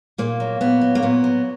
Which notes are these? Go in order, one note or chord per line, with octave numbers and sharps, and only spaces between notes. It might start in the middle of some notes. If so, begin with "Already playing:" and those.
A#2 A#3
F#3
A#2 B3
F#3
A#3
A#2 B3
F#3